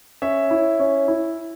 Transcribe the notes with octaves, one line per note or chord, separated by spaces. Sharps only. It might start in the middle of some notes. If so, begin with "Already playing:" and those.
C#4 C#5 E5
E4
C#4
E4